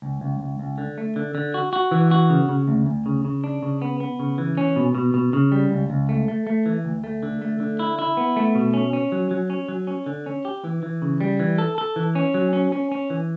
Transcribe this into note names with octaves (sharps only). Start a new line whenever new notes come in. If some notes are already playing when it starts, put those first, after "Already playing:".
C#2
C#2
C#2
C#2
D3
A3
D3
D3
F#4
F#4
E3
F#4
C#3
C#3
D2
D2
C#3
C#3
D4
C#3
B3
B3
C#3
E3
C#4
B2
B2
B2
C#3
G3
C#2
C#2
A3
A3
A3
E3
D2
A3
D3
A3
D3
E4
E4
B3
A3
B2
C#4
C#4
F#3
F#3
C#4
F#3
C#4
D3
C#4
G4
E3
E3
C#3
G3
E3
A4
A4
E3
C#4
F#3
C#4
C#4
C#4
E3